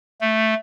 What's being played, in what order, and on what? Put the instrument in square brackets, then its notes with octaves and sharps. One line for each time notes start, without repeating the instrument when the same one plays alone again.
[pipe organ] A3